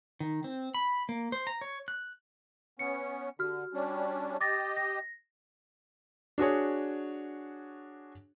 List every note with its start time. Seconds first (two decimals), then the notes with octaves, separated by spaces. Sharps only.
0.20 D#3
0.44 C4
0.74 B5
1.09 A#3
1.32 C5
1.47 A#5
1.61 C#5
1.88 F#6
2.79 B3 C#4 C#7
3.39 D3 F#4 G4 F6
3.74 G3 C#4 D4
4.41 G4 D#5 D6 A6 A#6
4.77 A#6
6.38 D4 F#4 G#4 C#5